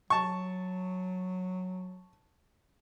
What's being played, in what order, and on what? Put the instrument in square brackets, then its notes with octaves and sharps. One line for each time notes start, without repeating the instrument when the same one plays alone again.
[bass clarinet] F#3 [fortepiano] A5 C#6